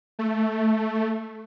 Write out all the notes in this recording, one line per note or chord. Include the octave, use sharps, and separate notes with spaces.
A3